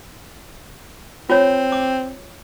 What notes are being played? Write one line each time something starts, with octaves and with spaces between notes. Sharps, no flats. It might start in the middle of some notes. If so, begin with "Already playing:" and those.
C4 F4 C#5
D6